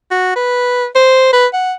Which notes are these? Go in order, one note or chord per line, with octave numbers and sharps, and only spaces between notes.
F#4
B4
C5
B4
F#5